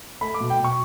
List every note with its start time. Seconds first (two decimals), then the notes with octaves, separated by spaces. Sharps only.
0.21 A3 B5
0.34 D6
0.40 B2
0.50 G5
0.60 B2 C#6